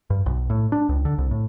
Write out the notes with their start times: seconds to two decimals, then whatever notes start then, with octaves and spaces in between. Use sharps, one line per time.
0.10 G2
0.26 B1
0.50 A2
0.72 D4
0.89 C#2
1.05 D3
1.18 C2
1.31 A2